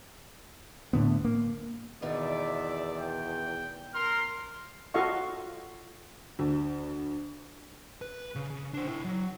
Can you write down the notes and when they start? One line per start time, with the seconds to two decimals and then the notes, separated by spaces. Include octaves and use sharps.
0.93 A2 D3 B3
1.25 A#3
2.02 E2 B2 D#3 B3 D5 E5
3.00 G5
3.94 A#4 C6 F6
4.94 F4 F#4 A4 D#5 F5 C#6
6.39 D2
8.02 B4
8.35 C#3
8.50 C#3
8.74 D4 C5
8.88 E4 G5
9.05 F#3